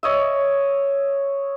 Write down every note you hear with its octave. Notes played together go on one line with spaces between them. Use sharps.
C#5 D#5 E5